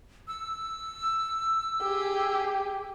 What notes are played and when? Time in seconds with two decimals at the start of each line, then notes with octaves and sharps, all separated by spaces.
0.28 E6
1.82 G4 G#4